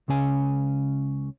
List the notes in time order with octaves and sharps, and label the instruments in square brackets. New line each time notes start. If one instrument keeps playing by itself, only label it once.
[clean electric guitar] C#2 C#3 C#4 G#5